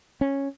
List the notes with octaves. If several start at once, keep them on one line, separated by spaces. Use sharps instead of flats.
C#4